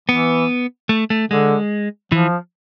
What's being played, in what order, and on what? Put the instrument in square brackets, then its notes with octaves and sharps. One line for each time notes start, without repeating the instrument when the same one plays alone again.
[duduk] E3 [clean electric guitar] B3
[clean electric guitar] A3
A3
[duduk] D3 [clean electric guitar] G#3
[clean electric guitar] E3 [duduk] F3